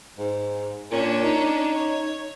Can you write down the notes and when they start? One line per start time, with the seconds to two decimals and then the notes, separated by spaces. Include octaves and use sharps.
0.19 G#2
0.91 A#2 C#4 D4
1.24 D#4
1.73 C#5